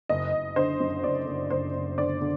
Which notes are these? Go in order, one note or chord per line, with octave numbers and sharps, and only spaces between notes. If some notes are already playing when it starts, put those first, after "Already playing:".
F#1 D#5
F#1
D3 C5
F#2
F#1 D5
F#1
F#1 C5
F#1
D3 D5
D3